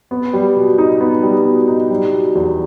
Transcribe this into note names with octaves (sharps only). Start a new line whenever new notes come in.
B3
G3
B2
D#4
B3
G3
B2
D#4
G3
B2
E2